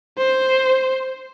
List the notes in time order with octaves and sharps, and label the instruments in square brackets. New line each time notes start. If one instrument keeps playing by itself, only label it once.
[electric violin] C5